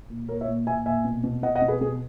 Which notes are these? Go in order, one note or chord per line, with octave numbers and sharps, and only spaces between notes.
A#2
A#2 A#4 C#5
C#5 E5
A#2
A#2 E5 G#5
A#2 E5 G#5
B2
B2
B2 D#5 F#5
D#5 F#5
B2
G#4 B4
B2 G#4